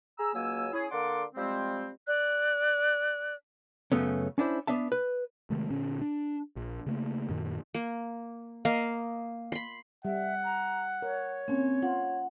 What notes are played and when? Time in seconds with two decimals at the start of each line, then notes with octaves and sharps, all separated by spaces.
0.19 G#4 A#5 E6
0.33 C#2 F#3 A#3 G#5 E6
0.73 C#4 E4 G#4
0.91 D3 A#3 D5 F#5 C6 D6
1.35 F3 G3 G#3 C4
2.08 D5 F#6
3.92 F#2 C#3 A3 B3 C#4
4.38 C#4 D4 E4 C5
4.67 B3 D4 E5 A5
4.92 B4
5.50 C3 D#3 G#3 A3
5.70 A#2 D3 C#4
6.01 D4
6.56 A#1
6.86 C#3 A3 A#3
7.29 F#2 A#2 D#3
7.75 A#3
8.65 A#3 D#5 F5
9.52 B5 C6
10.05 G3 E5 F#5
10.44 A#5
11.02 A#4 C#5
11.48 A#3 C4 C#4
11.83 F4 F#5